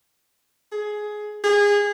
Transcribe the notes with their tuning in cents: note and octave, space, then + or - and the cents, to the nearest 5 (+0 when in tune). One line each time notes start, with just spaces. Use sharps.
G#4 +15
G#4 -20